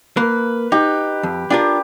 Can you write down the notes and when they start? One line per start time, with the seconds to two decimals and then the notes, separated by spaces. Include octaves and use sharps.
0.17 A#3 B4
0.72 D#4 G4
1.23 F2
1.50 D4 F4 G4 A#4